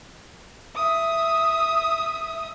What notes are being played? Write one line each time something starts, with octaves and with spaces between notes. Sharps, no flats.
E5 D#6